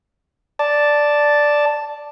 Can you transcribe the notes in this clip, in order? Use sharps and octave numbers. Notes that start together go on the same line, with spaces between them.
D5 A5